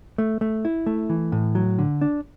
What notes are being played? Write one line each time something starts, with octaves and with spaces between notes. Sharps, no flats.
A3
A3
E4
A3
E3
A2
F#3
D3
D4